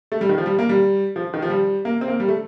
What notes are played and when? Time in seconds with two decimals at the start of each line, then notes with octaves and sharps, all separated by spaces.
0.12 A3
0.21 G3
0.29 D#3
0.38 F3
0.46 G3
0.59 A#3
0.69 G3
1.16 F3
1.34 D#3
1.42 F3
1.50 G3
1.85 A#3
2.01 C4
2.08 A#3
2.20 G3
2.28 A3